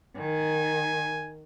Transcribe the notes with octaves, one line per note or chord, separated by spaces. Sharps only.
D#3 G#5